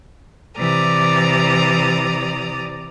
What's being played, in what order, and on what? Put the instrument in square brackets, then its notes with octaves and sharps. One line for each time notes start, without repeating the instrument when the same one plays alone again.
[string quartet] C3 E3 D5 A#5 D#6